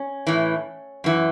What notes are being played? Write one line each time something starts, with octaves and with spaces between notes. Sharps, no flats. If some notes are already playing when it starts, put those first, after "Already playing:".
Already playing: C#4
A2 E3
F#2 E3